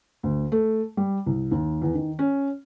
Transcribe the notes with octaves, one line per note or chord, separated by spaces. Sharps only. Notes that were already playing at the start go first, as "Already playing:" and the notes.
D2
A3
G3
C2
D#2
E2
D#3
C#4